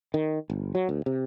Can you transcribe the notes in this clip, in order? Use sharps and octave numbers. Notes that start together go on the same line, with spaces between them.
D#3
G1
F#3
D2
C3